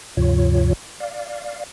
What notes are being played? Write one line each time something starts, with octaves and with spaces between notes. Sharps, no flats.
D2 G2 C3 F3 F4 C#5
D5 F5